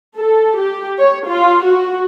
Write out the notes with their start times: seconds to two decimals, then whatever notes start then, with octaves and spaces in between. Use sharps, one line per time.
0.16 A4
0.58 G4
0.99 C#5
1.29 F4
1.64 F#4